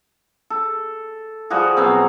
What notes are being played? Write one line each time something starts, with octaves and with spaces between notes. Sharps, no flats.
A4
F3 G3 F#4 G#4
B2 F#3 C4